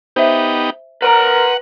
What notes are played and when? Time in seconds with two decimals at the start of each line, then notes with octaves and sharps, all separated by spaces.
0.16 B3 D#4 G4 C5 E5
1.02 A#4 B4 F#5 A#5